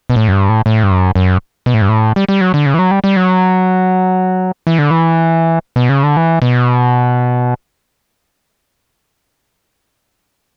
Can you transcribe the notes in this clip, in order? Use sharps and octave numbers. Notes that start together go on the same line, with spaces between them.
B2
A2
F#2
G2
A2
A2
G2
F#2
F#2
B2
A2
G2
A2
G3
G3
F#3
D3
C#3
E3
F#3
G3
G3
F#3
E3
D3
E3
B2
C#3
D3
E3
B2